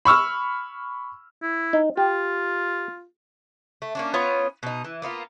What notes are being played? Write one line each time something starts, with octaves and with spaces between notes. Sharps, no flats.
B5 C#6 E6 F6
E4
D#4
F4 G4
A3
A#3 C#4 D4
B3 C#4 F4 C#5
B2 D#4
E3
A#3 B3 E4 F4